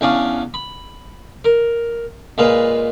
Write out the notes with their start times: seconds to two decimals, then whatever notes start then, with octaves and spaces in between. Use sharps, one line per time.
0.01 E2 C#4 D4 F5
0.54 B5
1.45 A#4
2.38 A#2 G#3 B4 F5